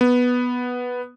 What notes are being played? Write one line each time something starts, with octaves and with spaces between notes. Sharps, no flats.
B3